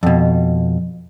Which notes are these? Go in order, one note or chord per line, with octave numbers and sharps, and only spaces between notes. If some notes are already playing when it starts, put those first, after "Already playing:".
F2 B2